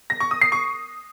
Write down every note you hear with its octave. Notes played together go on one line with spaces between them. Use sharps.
A#6
C#6
D#6
C7
C#6